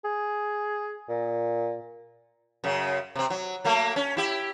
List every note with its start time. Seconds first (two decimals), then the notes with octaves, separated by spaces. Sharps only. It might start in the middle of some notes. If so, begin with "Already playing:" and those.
0.04 G#4
1.09 A#2
2.64 F#2 C#3
3.15 C3 C4
3.30 F#3
3.64 F#3 A3 A#3
3.96 C#4
4.17 E4 G4